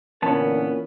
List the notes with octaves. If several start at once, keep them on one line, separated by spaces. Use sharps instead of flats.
A#2 D3 E3 B3 C#4 A#4 C#5 A5